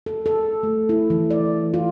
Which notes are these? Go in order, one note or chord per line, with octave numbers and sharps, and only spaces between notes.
A4
A4
A3
E4
E3
D5
F4